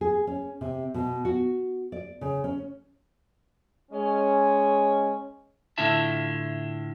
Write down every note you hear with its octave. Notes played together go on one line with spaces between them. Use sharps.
G#4
C#4
C3
B2
F#4
D5
C#3
C#4
G#3 C#4
A2 D3 E4 F4 E5 A5